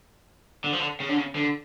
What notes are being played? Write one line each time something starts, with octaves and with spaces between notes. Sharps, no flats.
D3
F3
D3
C#3
D3
C#3
D3